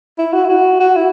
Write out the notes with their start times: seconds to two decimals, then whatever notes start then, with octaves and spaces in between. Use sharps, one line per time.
0.18 E4
0.33 F#4
0.45 E4
0.49 F#4
0.80 F#4
0.96 E4